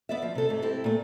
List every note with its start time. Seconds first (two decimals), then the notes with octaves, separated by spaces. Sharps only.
0.09 B3 D5 E5
0.22 F3
0.35 C3 A4
0.49 G#2 A3
0.62 C4 E4 G4 A4
0.84 A#2 A3